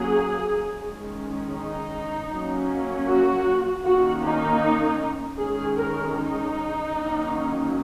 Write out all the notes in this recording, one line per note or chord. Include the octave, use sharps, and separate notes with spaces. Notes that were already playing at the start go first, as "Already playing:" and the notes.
Already playing: F#3 A#3 C#4 G#4
D#3 G#3 C#4
D#4
F#3 A#3 C#4
F#4
D#3 A#3 C#4 F#4
D#4
D#3 G#3 C#4 G#4
A#4
D#4
D#3 F#3 A#3 C#4